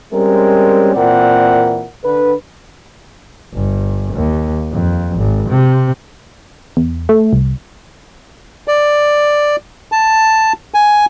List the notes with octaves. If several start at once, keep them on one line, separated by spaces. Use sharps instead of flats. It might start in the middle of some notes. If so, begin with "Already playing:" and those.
G3 G#3 C4 C#4 A#4
A#2 E3 C4 A#4 D5 F#5
D3 B4
G1
D#2
F2
G#1
C3
E2
A3
C2
D5
A5
G#5